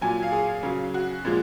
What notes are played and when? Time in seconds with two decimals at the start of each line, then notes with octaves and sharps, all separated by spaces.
0.01 A#2 F#3 G#5
0.23 F5
0.32 G#4
0.63 C#3 F#3
0.94 F#4
1.25 A#2 F3 G#3